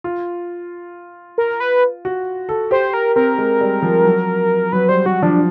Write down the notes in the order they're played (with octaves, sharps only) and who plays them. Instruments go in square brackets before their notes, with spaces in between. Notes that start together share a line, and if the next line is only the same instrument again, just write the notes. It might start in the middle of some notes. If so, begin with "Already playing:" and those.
[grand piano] F4
[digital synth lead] A#4
B4
[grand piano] F#4
A4
[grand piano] G4 [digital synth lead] C5
[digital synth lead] A#4
[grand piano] C4 [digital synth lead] A#4
[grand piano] G#3
G3
F3
F#3
[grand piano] F#3 [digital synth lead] B4
[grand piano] G3 [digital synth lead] C5
[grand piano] F#3 [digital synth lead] F#4
[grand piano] F3 [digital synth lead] D4